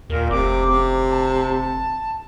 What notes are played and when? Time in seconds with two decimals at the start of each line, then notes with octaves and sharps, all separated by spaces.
0.10 D#2 A#2 A#4
0.30 F1 C3 D6
0.66 C3
1.10 A5